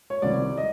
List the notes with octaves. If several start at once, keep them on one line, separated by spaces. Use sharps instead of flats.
C#5
C2 C3 D#3 D5
D#5